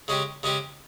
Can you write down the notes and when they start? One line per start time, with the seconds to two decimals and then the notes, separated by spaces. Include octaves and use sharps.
0.08 C#3 G#3 C#4 G4
0.43 C#3 G#3 C#4 G4